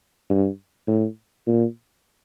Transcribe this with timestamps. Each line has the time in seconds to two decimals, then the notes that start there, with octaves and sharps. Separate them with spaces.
0.30 G2
0.88 A2
1.47 A#2